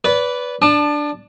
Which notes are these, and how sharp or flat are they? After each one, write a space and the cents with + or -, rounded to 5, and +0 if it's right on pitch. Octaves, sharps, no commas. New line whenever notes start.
B4 +0 D5 -25
D4 +0 A5 +0 D6 +40